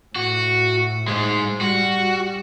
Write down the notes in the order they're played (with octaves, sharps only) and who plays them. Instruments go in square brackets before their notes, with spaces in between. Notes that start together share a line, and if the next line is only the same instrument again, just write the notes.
[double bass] A2 [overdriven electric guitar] F#4
[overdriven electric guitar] G#2 G#3
[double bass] G3 [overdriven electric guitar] F#4